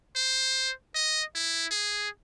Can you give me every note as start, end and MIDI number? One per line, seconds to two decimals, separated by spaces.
0.16 0.72 72
0.95 1.23 75
1.36 1.66 64
1.71 2.09 68